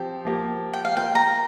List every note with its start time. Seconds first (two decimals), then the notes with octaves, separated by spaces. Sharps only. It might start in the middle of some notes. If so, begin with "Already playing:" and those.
Already playing: F3 C4 G4 G5
0.25 F3 A#3 G4
0.73 G5
0.85 F5
0.97 A#3 F4 A#4 D#5 G5
1.15 A#5